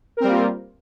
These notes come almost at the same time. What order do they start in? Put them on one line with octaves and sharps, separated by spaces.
A#4 C4 G3 A#3 F4